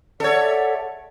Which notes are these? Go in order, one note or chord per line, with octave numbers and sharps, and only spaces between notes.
A4 C#5 D5 E5 F#5